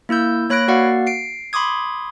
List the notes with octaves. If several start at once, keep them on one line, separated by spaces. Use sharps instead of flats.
A#3 E4 E6 G6
A#3 C#5 B5 F#6 A#6 D7
A#3 F#4 D5 F5 F#5
C7 D7
B5 C6 D6 D#6 G#6